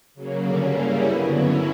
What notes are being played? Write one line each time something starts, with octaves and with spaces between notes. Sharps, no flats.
C#3 F#3 A#3
G2 D3 A#3 C#4 D5
C#3 G3 A#3 C#4 E4
F#2 D3 F#3 B3 B4
G2 F#3 C#4 E4 C#5